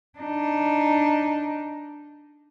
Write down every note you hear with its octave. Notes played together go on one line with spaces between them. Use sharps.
D4 D#4